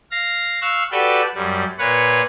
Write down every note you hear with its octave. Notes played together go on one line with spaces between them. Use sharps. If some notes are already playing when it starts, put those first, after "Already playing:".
F5 A#6
F5 C#6 E6 F#6
F#4 G4 A4 B4 D5 G5
F#2 G3
A#2 B4 C#5 F#5